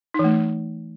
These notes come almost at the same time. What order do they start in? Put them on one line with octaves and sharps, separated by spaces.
D#4 E3 A3